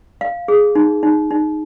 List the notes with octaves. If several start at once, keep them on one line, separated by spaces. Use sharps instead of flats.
F5
G#4
D#4
D#4
D#4